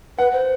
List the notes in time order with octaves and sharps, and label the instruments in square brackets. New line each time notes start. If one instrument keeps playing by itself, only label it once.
[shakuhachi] B4 [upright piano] F#5
[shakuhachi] C5